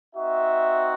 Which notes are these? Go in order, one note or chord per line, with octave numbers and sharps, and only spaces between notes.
C4 D#4 F#4 E5